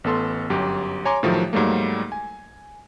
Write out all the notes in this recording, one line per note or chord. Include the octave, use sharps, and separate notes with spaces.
A1 B3 A4 C6
G1 F#2 G4
C#5 G#5 A#5 C6 D6
A2 D#3 F3 F#3 A3 G4
G#2 F#3 G3 A3 A#3
G#5